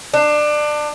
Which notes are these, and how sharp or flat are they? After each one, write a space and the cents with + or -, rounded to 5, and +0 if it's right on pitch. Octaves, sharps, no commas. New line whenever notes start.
D4 +25